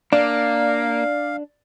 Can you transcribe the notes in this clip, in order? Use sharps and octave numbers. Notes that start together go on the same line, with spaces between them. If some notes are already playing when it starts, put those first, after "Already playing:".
A#3 D4 D5 F5